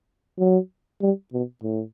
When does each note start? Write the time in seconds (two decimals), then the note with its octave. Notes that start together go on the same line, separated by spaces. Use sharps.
0.39 F#3
1.01 G3
1.33 B2
1.63 A2